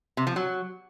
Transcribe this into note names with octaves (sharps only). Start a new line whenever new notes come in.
C3
F3
F#3